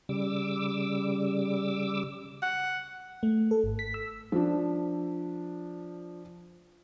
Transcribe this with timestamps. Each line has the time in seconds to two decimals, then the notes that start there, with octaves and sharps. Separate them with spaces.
0.09 C#3 G3 D6 E6
2.42 F#5
3.23 A3
3.51 A4
3.64 G#1
3.79 B6
3.94 E6
4.32 F3 D4